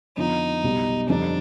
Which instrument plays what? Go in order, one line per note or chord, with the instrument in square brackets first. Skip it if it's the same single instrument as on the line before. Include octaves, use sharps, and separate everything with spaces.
[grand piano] F2 D3 F3 B3 F4 [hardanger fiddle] D#4
[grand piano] B1 B2 G3 B3
[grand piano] F2 D3 G3 C4 D#4 [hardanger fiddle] D4